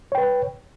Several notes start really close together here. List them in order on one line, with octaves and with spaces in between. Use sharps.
C#5 G5 B4